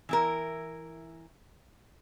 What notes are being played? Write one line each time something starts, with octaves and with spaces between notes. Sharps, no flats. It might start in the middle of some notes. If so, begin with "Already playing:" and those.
E3 E4 A#4